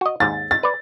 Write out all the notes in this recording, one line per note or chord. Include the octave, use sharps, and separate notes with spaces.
F#4 D#5
D#2 G#2 A6
A6
B4 D5